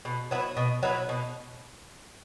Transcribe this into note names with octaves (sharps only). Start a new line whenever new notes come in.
B2
F#3 B3 E4
B2
F#3 B3 E4
B2